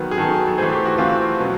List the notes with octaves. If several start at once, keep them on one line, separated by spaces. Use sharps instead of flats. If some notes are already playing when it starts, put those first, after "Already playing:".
Already playing: D#3 F#3 B3
G#4
D#3 F#3 B3 A4
A4
E3 A3 C4 G#4
G4
F#4
E3 A3 C4 F4
B2 F#3 B3